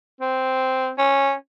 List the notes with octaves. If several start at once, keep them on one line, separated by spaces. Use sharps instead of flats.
C4
C#4